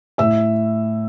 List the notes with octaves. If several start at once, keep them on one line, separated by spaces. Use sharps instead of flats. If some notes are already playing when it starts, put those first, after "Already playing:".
A2 E5 E6